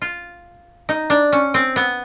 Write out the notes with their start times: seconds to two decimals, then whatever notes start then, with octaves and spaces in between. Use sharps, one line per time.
0.02 F4
0.89 D#4
1.10 D4
1.33 C#4
1.54 C4
1.76 B3